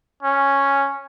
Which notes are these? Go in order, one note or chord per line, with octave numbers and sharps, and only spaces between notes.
C#4